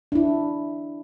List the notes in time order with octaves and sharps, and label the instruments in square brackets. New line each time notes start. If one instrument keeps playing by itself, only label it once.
[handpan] D4 E4